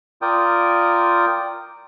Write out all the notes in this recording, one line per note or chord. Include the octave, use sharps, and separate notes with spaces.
F4 A#4 D5 G5 D#6